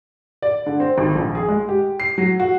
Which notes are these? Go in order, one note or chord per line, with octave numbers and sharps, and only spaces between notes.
D5
D3
C4
G#1
A#1
G#4
G#3
G4
C7
F#3
F#4